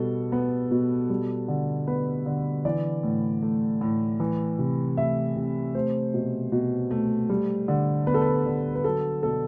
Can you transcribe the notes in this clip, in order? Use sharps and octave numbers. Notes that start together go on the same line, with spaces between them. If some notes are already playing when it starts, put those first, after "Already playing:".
Already playing: B2 G3 A4
B3
B2
G3
D3
B3 B4
D3
E3 D5
A2
A3
A2
E3
C3
A3 E5
C3
A3 C5
B2
B2
A3
G3
D3
B3 B4
A4
B4
D3
B4
F#3 A4
B2 A4